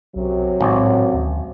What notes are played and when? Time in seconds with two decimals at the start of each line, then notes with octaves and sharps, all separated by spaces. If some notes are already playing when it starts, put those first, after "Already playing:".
0.16 B1 F#2 C3 F#3
0.61 G#1 A2
1.14 D2